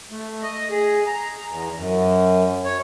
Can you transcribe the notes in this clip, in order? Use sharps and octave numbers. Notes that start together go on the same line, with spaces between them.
A3
D#5
G#4
A#5
E2
F#2
C#5